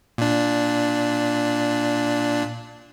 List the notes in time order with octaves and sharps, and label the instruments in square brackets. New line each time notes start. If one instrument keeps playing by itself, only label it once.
[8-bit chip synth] A#2 D4